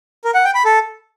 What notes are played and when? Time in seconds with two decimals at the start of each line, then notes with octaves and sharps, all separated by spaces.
0.24 A#4
0.35 F#5
0.45 G5
0.55 B5
0.65 A4